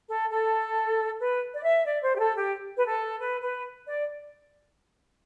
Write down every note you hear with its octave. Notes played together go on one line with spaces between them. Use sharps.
A4
A4
B4
D5
E5
D5
C5
G4
A4
G4
B4
A4
B4
B4
D5